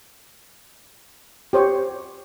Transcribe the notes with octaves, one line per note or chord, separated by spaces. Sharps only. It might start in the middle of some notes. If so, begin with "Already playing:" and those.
G4 C5 C#5